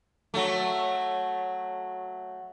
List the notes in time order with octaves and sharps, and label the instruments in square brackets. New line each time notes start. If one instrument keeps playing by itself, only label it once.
[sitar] F#3 A3